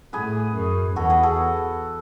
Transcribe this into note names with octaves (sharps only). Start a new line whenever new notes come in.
A2 G#4 B4
F#2
E2 F#4 A4
G#4 B4
F#4 A4